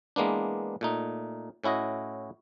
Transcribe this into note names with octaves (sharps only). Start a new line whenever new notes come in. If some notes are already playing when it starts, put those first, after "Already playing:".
E3 G#3 A#3 B3 D4
A#2 A3 D#4
A2 C#4 E4 F#4 D#5